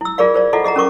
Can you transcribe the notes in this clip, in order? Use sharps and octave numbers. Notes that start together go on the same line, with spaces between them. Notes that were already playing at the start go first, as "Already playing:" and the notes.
E4 E6
F4 G#4 A#4 D5 F5
A#4 C5 D5
E4 F4 A4 D#5 F#5
G#4 D#5 F#5 A#5
C#4 A#4 C#6 D6